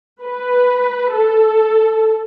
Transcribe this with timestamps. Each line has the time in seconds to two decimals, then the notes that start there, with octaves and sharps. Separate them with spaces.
0.22 B4
1.12 A4